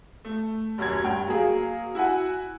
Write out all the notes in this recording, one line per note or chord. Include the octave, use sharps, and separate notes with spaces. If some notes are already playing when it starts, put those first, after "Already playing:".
A3
D#1 F#2 G#6
G2 G5
F#3 A#3 G#4
E4 F#4 F#5 G#5